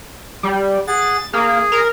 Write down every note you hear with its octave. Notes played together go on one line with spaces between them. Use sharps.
G3
G#4 F#5 A6
A#3 G#4
A#4